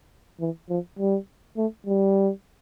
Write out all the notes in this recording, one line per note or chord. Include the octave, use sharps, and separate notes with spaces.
E3
F3
G3
A3
G3